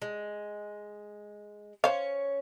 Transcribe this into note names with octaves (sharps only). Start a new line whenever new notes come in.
G#3
C#4 C5 C#5 F5